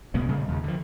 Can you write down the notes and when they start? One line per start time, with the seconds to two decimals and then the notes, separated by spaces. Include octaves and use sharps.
0.14 B2 G#3 A#3 B3
0.28 A#2 C#3 G3 G#3
0.48 D#2 C#3
0.64 D3 F3